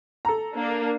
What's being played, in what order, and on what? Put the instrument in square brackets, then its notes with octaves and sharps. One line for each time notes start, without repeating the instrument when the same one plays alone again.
[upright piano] A4 A#5
[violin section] A#3 D4